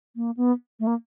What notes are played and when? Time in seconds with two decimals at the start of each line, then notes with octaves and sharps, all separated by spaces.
0.16 A#3
0.37 B3
0.80 A3
0.87 A#3